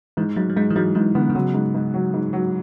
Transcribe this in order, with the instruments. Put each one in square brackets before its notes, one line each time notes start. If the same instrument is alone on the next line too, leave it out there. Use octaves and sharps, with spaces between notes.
[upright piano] G#2 [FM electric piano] E3
[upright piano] G#2 [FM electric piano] F#3
[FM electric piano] F#3
[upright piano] G#2 [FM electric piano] G#3
[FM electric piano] E3
[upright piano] G#2 [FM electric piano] F#3
[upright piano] G#2 [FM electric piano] E3
[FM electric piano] D3 [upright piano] B3
[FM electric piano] D3
[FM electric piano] C#3 [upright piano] F#3
[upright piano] G#2
G#2
F#3
G#2
F#3